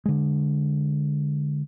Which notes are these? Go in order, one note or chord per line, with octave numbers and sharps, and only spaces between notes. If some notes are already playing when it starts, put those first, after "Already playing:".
D3 G#3